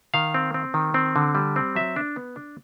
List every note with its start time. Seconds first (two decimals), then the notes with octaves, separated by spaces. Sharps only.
0.14 D#3 F5
0.34 C4
0.54 C4
0.74 D#3
0.94 C4
1.16 D3
1.35 G3
1.56 C4
1.75 F#3 E5
1.96 D4
2.16 B3
2.36 D4